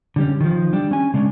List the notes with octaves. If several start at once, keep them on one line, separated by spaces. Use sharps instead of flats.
D3 G3 C#4
D#3 F3
G3 D4 G4
C#4 G#5
C#3 G#3 C#4 D4